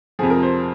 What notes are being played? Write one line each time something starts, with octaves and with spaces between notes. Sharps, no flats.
F2 C3 F3 G#4
A#4
C5